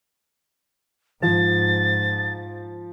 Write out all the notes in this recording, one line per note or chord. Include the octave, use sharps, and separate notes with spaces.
G#2 F3 A6